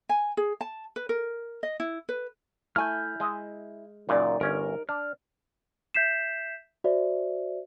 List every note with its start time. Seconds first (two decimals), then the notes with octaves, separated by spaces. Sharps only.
0.09 G#5
0.37 G#4
0.61 A5
0.96 B4
1.09 A#4
1.63 D#5
1.80 E4
2.09 B4
2.76 A3 E4 G#5 F6 G6
3.20 G#3 D#5 E5
4.09 F#2 A#2 C#3 D#4 D5
4.41 G1 C#4 A#4
4.89 D4 F6
5.94 E5 G6 B6 C7 E7
6.84 F#4 C5 D5 E5